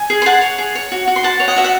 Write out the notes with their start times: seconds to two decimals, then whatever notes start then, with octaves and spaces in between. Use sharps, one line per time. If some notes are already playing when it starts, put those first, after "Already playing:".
Already playing: G#5
0.10 G#4
0.22 C6
0.26 G#4 F#5 A5
0.41 C#5
0.58 G#4
0.75 C#5
0.92 F#4
1.08 F#4
1.16 C6
1.23 F#4 F#5 A5
1.40 C#5
1.48 D#5 F#5
1.56 F#4 E5
1.64 F#5